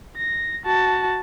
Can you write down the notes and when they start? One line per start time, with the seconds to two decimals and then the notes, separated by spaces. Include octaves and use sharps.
0.17 A#6
0.66 F#4 A5